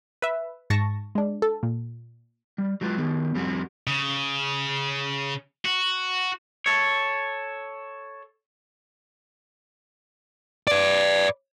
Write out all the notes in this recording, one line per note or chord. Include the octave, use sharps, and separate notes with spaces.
B4 E5
G#2 A5 C#6 A#6
G#3 D4
A4
A#2
G3
F#3 G#3 F4 B4
D#3 B3
F2 G3 C4 F#4
C#3
F#4
A4 C#5
B4 D5